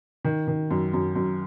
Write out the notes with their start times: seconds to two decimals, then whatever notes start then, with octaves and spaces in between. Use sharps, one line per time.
0.25 D#3
0.48 D#3
0.71 F#2
0.93 F#2
1.16 F#2